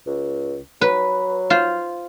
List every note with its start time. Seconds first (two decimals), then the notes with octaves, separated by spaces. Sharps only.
0.07 C#2
0.81 F#3 B4
1.50 F4 C5